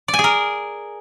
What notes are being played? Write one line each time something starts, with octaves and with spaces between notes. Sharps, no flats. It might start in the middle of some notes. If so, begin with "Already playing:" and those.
D5
G#5
G#4
A#4